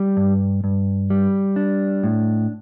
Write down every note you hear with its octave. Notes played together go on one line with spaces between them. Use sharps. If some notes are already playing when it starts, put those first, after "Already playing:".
Already playing: G3
G2
G2
G3
D4
A2